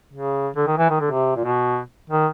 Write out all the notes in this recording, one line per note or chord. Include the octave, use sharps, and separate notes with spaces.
C#3
D3
D#3
E3
D#3
D3
C3
A#2
B2
D#3